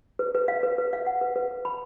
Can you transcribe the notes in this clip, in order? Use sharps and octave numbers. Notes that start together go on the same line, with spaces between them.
B4
B4
F5
B4
B4
F5
F#5
B4
B4
B4
B5